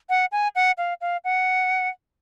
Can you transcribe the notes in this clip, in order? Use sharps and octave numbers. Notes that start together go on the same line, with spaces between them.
F#5
G#5
F#5
F5
F5
F#5